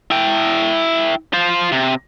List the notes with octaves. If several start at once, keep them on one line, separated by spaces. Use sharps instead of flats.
E4 G5
F4 C5
C3